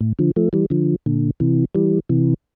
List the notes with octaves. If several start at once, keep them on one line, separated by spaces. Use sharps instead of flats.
A2
D3 F3
F3 A3
E3 G3
D3 F3
A#2 D3
C3 E3
E3 G3
C3 E3